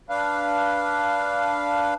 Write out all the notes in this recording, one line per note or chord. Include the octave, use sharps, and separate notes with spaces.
D4 B4 F5